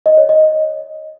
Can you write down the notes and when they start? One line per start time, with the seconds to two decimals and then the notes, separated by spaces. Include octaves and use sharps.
0.06 D#5
0.17 C#5
0.29 D#5